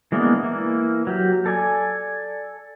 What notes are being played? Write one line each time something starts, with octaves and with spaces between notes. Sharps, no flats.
E3 G#3 A#3 B3 D4
E3 A#3
F#3 G4
A4 D5 G#5